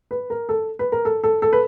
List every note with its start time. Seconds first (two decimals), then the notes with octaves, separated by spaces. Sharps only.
0.11 B4
0.30 A#4
0.49 A4
0.79 B4
0.92 A#4
1.05 A4
1.24 A4
1.42 A4
1.53 B4